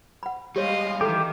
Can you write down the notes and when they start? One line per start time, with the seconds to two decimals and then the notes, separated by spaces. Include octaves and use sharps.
0.23 F#5 B5
0.56 G3 G#3 G4 C#5 D#5 F5 C6
1.01 D#3 E3 G4 A4